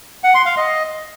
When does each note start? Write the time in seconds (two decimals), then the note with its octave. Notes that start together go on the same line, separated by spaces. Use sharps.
0.24 F#5
0.35 C6
0.46 F5
0.57 D#5